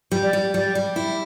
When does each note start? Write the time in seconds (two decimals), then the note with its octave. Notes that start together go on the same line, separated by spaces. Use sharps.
0.12 G3
0.23 D5
0.33 G3
0.54 G3 D5
0.75 G3
0.96 E4